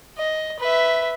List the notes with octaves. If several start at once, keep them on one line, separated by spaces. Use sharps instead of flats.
D#5
B4 E5